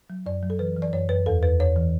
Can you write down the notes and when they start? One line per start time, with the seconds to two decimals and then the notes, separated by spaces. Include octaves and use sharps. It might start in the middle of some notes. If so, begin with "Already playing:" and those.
0.10 F#3
0.26 F#2 D5
0.43 F#3
0.50 A4
0.59 E3 B4
0.76 E3
0.82 D5
0.93 F#2 C#5
1.09 F#2 B4
1.26 E2 A4
1.43 E2 B4
1.59 E2 C#5
1.76 E3